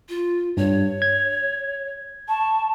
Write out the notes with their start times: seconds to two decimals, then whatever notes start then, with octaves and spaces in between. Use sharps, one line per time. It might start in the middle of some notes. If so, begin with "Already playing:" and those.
0.09 F4
0.57 G2 C#5
1.02 G#6
2.29 A5 C#6